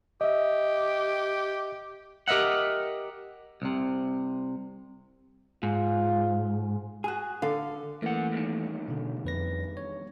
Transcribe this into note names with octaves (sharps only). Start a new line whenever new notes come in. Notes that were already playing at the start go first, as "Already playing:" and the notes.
G4 D#5 E5
G4 A#4 D#5 E5 F#5
C2 C3
G#2 F4
F#4 G#4
D3 A4 F5
F#2 E3 A3 A#3 F#5
E2 G2 D#3
B2 D3
F2 B4 A#6
C#5